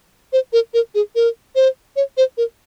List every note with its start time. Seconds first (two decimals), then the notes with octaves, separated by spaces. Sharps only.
0.33 C5
0.53 A#4
0.74 A#4
0.95 G#4
1.15 A#4
1.56 C5
1.96 C#5
2.17 C5
2.37 A#4